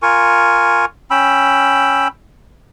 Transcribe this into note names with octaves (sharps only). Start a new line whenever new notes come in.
F4 A#4 G#5 C#6
C#4 G5 B5 E6